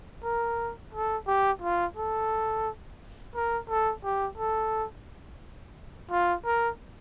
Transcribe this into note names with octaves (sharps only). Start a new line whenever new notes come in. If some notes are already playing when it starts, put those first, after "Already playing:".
A#4
A4
G4
F4
A4
A#4
A4
G4
A4
F4
A#4